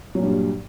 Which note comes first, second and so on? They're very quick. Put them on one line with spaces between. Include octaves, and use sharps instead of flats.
F#3 A#2 G2 G3